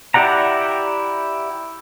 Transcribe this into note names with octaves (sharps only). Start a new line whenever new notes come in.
E4 G4 D5 F#5 A#5